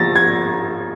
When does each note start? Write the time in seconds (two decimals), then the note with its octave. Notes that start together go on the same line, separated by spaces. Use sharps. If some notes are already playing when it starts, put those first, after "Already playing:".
Already playing: F3 A6 A#6
0.16 G#6